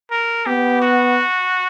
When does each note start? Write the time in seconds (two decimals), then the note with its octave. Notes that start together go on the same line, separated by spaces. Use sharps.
0.11 A#4
0.46 B3 G4
0.82 F#4